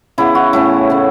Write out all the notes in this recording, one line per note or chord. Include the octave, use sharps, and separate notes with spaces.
C#3 E3 B3 E4
F#4
A2 A3 C#4 E4
C#3 A3 C#4